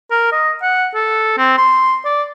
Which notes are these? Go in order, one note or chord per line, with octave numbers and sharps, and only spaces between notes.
A#4
D#5
F#5
A4
C4
C6
D5